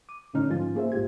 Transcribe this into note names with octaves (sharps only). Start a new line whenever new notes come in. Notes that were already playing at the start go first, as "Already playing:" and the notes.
D6 D#7
G1 A2 D3 C#4 D#4 F6
G#2 F3 F4 G#5 C6 A6
A#3 G#4 C5 E5
A#1 G#2 F4 G4 G#6